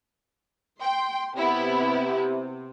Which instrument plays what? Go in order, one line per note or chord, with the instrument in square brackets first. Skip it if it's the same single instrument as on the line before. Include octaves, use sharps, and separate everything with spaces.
[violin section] G5 [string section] C6
[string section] C3 [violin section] B3 E4